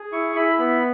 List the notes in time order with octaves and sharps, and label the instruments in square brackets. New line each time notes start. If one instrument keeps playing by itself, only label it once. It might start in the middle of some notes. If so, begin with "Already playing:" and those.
Already playing: [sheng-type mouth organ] G#4
E4 C#6
E4 B5
B3 B5